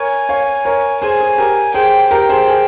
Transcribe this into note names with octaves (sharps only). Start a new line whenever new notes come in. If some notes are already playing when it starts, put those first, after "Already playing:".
Already playing: A#4 C#5 G#5
C#5 F5
A#4 C#5
G#4 C5 G#5
G#4
G4 A#4
G#4 C5 G5
G4 A#4 G5
G#4 C5
G#4